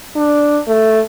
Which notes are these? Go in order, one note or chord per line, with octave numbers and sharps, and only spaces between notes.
D4
A3